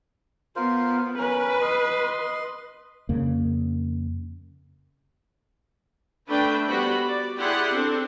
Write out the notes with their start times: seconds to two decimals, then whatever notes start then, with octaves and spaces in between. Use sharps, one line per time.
0.56 B3 F4 A#4 C5
1.18 C#4 A#4 B4
1.61 D#5 C6
3.09 F2 C#3 A#3
6.29 A3 D4 B4 G5
6.68 G3 B3 F#4 C5 B5
7.04 D5
7.38 E4 G4 G#4 D5 F#5 C6
7.74 C4 D4 A4